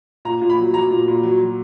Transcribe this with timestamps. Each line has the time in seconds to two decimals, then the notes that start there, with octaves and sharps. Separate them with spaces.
0.25 A#2 A#5
0.42 A#2
0.50 B5
0.58 F#3
0.74 F#3 A#5
0.91 A#2
1.08 A#2
1.23 F#3
1.40 F#3